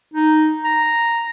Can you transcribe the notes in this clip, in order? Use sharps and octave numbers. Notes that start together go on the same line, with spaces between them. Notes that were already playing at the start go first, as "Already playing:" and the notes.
D#4
A#5